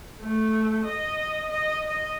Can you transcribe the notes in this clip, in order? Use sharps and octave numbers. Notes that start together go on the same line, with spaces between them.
A3
D#5
D#5
D#5